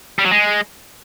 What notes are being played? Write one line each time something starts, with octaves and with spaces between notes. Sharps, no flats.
G3
F#3
G#3